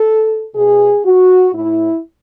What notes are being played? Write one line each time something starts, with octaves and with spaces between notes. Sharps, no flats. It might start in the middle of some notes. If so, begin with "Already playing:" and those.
Already playing: A4
B2 G#4
F#4
A2 E4